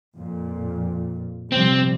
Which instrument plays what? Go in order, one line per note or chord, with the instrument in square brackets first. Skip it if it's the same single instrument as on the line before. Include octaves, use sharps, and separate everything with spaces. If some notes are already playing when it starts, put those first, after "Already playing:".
[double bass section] F2 A#2
[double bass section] C3 F3 G3 [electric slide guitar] C4